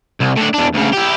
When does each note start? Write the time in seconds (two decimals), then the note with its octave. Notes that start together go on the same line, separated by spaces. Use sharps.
0.20 C2
0.36 A2 D4
0.54 E2 D4
0.74 D2 C#3
0.93 E4 G4